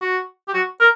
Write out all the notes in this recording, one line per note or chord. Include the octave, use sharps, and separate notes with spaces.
F#4
G4
F#4
A#4